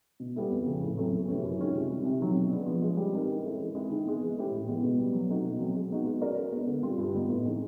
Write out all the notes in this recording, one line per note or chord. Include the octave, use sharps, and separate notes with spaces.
B2
G3 B3 E4 A4
F2
C#3 F3
A2
F#3 A3 C4
E2
C3 E3 A3 C#4
F#2
D#3 G#3 C#4 F4
C3
D#3 G3 C4 E4
C3
D#3 F#3 A3 C4
B2
G#3 B3 D4
F3
G#3 C#4
G3
C4 D#4 G4 A#4
E3
G#3 C#4 E4 A4
E3
G#3 C4 E4 G#4
D#3
G#3 B3
E3
A3 C#4 E4 G4
A2
E3 G#3 B3
B2
G3 B3
F#3
A3 C4 D#4 F#4
B2
F#3 A3 C4
G#3
B3 D#4 F#4
G#3
C#4 F#4 A#4 D5
G#3
B3 D4
D3
G3 C4 F4
G2
D#3 G3 B3 D#4
A2
E3 G#3 C4 D#4